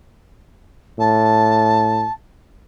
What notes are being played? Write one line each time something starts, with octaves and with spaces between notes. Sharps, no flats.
A2 A5